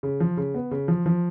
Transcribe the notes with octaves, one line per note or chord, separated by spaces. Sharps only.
C#3
F3
C#3
B3
C#3
F3
F3